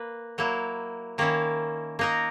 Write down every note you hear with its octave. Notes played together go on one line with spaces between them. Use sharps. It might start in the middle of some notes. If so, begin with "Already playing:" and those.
Already playing: A#3 B4
F#3 A#3 E4
D#3 A#3 C#4 E4
A#3 D#4 A#4